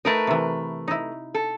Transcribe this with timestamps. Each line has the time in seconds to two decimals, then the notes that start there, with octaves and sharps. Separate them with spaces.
0.05 A3 D#4 A#4 B4
0.27 C3 E3
0.88 D#4 E4
1.35 A4